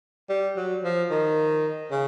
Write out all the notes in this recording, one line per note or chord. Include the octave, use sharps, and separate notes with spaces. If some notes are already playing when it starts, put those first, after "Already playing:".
G3
F#3
F3
D#3
C#3